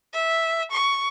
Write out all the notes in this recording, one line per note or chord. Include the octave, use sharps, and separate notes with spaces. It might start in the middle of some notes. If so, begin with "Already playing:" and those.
E5
C#6